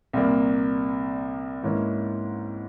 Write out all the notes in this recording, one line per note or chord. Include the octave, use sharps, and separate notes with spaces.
C2 A#2 G3 A#3
G#2 E3 A#3 C#4